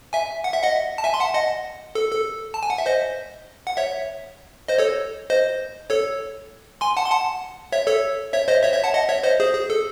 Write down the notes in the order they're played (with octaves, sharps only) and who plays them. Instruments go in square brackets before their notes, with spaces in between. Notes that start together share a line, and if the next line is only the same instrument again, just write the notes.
[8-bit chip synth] E5 G#5
F#5
E5
D#5 F#5
A5
E5 G#5
C6
F#5 A5
D#5 F#5
A4
A4
A5
G#5
F#5
E5
C5 D#5
F#5
C#5 E5
C5 D#5
A4 C#5
C5 D#5
A4 C#5
G#5 C6
F#5 A5
C6
F#5 A5
C#5 E5
A4 C#5
C#5 E5
C5 D#5
C#5 E5
C#5 E5
F#5 A5
D#5 F#5
C#5 E5
C5 D#5
G#4 C5
G#4
A4